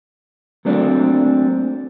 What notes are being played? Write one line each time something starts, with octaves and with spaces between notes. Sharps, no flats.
F#3 A3 A#3 C4 D4